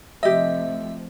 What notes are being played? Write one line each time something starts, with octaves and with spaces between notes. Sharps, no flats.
C3 F3 A3 G4 D#5 E5